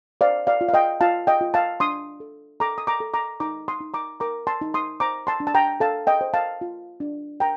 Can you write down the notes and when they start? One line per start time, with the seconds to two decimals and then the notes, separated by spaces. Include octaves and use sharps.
0.21 C5 D5 F5
0.47 D5 F5
0.61 F4
0.69 F5
0.74 D#5 G5
1.01 F4 F5 A5
1.27 D#5 G5
1.41 F4
1.54 F5 A5
1.80 D4 C6 D#6
2.20 A4
2.60 A4 A#5 D6
2.78 D#6
2.87 A#5 D6
3.00 A4
3.14 A#5 D6
3.40 D#4 A#5 D6
3.68 C6 D#6
3.81 D#4
3.94 A#5 D6
4.20 A#4 A#5 D6
4.47 A5 C6
4.61 D#4
4.74 C6 D#6
5.00 C5 A#5 D6
5.27 A5 C6
5.40 D4
5.47 A5
5.55 G5 A#5
5.80 A4 F5 A5
6.07 D#5 G5
6.21 C5
6.34 F5 A5
6.61 F4
7.00 D4
7.40 A#4 G5 A#5